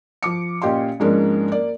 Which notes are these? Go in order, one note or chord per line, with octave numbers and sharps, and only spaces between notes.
F3 D6 C#7
A#2 C#4 G4 D#5 F5 C6
G#2 F3 G#3 A#3 C#4 D4
A#3 D5